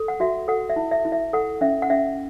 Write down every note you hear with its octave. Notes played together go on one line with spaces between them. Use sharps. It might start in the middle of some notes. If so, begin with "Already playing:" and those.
Already playing: A4
F#5
F#4 E5
A4 F#5
E5
E4
E5
E4
E5
A4 F#5
C#4 E5
F#5
C#4 E5